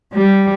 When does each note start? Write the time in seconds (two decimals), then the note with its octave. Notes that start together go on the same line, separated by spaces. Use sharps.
0.13 G3